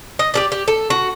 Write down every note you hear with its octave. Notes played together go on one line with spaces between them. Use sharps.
D#5
G4 A4 D5
G4
A4
F#4